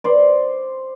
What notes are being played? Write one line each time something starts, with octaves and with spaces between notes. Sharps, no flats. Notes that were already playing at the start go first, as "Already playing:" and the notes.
C5 D5